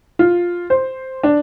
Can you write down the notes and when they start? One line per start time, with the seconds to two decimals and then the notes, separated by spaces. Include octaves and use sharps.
0.19 F4
0.70 C5
1.23 D4